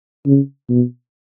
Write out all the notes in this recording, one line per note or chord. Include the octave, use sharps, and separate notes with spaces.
C#3
B2